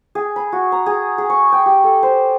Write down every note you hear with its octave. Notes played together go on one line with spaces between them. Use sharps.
G#4
B5
F#4
A#5
G#4
G#4
C#6
G5
G4
A4
C5